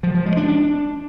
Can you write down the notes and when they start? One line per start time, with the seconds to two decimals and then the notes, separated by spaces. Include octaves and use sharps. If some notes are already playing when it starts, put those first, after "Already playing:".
0.03 F3
0.15 F3
0.26 G#3
0.37 D4
0.48 D4